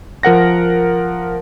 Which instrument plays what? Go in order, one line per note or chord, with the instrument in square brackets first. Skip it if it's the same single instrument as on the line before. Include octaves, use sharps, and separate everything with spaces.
[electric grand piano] F3 A#4 F#5 A#6